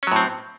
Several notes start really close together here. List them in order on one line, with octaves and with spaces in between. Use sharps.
C#4 F#3 A2 C4